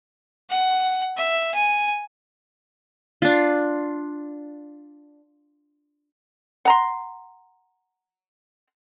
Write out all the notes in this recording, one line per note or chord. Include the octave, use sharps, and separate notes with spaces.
F#5
E5
G#5
D4 F4
F#5 A#5 C6